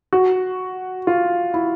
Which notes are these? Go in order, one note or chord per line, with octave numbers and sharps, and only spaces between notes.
F#4
F4
E4